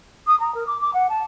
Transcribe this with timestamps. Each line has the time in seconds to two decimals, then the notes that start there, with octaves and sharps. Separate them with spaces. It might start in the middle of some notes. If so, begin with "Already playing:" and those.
0.27 D#6
0.40 A#5
0.55 A#4
0.67 D6
0.81 D6
0.94 F#5
1.09 A5